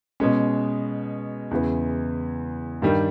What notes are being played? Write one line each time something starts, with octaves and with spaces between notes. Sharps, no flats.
B2 G#3 C#4
E2 C#3 E3
G2 D#3 G3